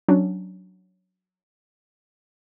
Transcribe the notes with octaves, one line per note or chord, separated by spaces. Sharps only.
F#3 C#4 D4